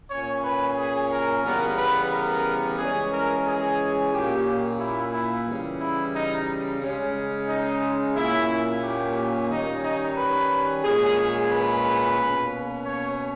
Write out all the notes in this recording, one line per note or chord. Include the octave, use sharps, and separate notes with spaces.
A#2 A#3 C#4 C#5
B4
G#4
A#4
C#3 E3 G3 B3 A#4
B4
A#4
E3 G#3 C#4 G#4
A#4
G#4
A#2 A#3 C#4 G4
E4
E4
C#3 E3 G3
E4
D#4
C#3 G#3 C#4
D#4
A#2 A#3 C#4 E4
G4
D#3 G3 C#4 D#4
D#4
B4
A#2 G#3 C#4 G#4
B4
B2 A#3 C#4
C#5